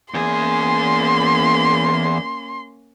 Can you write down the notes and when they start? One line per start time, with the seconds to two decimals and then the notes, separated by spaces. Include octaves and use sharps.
0.14 E2 A#3 C#4 G#4 C6